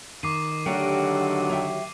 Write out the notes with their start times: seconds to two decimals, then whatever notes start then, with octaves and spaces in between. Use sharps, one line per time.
0.23 D#3 D6 C7 D#7
0.66 D3 D#3 F#3 A3 D4 F#4 G4 A#4
1.49 C#5 E5 G5